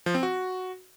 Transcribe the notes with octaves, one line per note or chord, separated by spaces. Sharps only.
F3
C4
F#4